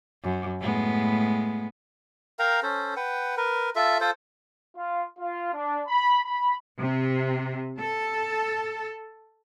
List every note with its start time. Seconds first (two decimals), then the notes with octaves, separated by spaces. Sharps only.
0.24 F#2
0.60 A2 G#3 B3
2.39 A#4 F5 G5 A#5
2.63 C#4 A4 C5
2.96 B4 F#5 G5
3.37 A#4 B4
3.76 F4 A4 E5
4.01 F4 A4 C5
4.76 F4
5.19 F4
5.53 D4
5.87 B5
6.24 B5
6.79 C3
7.78 A4